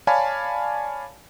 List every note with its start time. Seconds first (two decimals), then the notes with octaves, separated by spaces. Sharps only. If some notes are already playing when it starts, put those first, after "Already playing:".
0.07 C#5 D5 F5 G#5 A5 B5